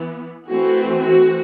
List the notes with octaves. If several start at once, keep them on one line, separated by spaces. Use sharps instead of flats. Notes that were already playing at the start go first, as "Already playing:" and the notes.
Already playing: E3 B3
E3 A3 C4 F#4
F#4